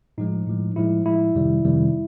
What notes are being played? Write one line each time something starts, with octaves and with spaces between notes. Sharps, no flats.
A2 F3 G#3 D#4
A2 F3 G#3
A2 F3 G#3 E4
A2 F3 G#3 E4
F2 C3 D#3 G3
F2 C3 D#3 G3